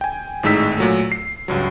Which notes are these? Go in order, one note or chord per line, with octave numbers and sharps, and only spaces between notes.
G5 G#5
G#1 A2 G#3 D#4 E6 B6
A#2 F#3 A3
C7
C#2 G2 F#3